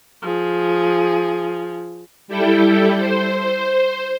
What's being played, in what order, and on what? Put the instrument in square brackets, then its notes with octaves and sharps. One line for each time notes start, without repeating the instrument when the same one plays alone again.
[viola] F3 G#4
[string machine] G3 E4 A4 G5
C5